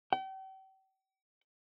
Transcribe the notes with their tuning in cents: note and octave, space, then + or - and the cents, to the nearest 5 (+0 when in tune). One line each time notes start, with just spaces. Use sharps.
G5 -40